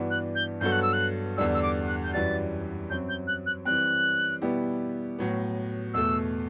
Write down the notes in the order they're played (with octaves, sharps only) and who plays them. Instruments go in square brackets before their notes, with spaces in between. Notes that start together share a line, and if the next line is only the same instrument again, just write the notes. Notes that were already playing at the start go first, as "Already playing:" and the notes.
Already playing: [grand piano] G2 E3 B3 D4 F#4
[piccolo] F#6
G6
[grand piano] G2 F#3 B3 F#4 A4 [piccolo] G6
[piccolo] F#6
E6
F#6
[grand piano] E2 D3 G3 D4 [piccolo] E6
[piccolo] E6
D6
F#6
G6
[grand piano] F#2 E3 G3 D4 F#4 [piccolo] A6
[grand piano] F#2 F#3 C4 [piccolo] G6
[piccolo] G6
F#6
F#6
[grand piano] E3 G3 C4 [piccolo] F#6
[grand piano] B2 G3 B3 E4 G4
A2 F#3 B3
[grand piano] E2 B2 A3 [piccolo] E6